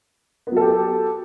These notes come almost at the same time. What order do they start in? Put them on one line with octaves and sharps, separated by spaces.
B3 F#3 A4 G4